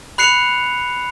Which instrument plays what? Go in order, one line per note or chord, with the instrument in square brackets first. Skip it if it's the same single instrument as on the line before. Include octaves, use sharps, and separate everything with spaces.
[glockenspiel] B5 F#6 C7 C#7 F7